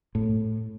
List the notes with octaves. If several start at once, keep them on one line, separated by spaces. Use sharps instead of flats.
A2